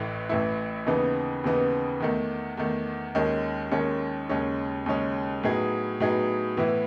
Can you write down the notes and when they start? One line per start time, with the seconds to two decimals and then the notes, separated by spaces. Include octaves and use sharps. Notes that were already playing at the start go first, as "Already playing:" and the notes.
Already playing: A1 A2 E3 A3 E4
0.29 A1 A2 E3 A3 E4
0.86 D#2 C#3 E3 B3 D#4
1.44 D#2 C#3 E3 B3 D#4
2.00 E2 D#3 A3
2.57 E2 D#3 A3
3.15 D#2 D#3 G#3 C#4
3.71 D#2 D#3 G#3 C#4
4.29 D#2 C#3 G#3 C#4
4.86 D#2 C#3 G#3 C#4
5.43 A2 F#3 B3 D#4 G#4
6.00 A2 F#3 B3 D#4 G#4
6.57 A2 E3 B3 E4